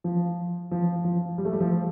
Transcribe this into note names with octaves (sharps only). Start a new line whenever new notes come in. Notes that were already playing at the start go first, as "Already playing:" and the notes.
F3
F3
F3
G3
A3
G3
F3